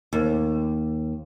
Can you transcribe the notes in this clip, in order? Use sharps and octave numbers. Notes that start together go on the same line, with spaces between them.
D#2